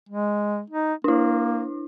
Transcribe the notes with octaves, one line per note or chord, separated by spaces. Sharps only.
G#3
D#4
A#3 D4 E4